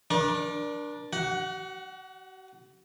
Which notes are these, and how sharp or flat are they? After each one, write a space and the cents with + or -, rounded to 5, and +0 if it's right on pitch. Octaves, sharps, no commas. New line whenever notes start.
D4 +0 A#4 +35 C#6 -35
F#4 +45 F#5 +0